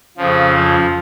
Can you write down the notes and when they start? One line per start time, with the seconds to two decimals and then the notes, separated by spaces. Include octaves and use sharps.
0.17 F2 C#3 F3
0.54 F3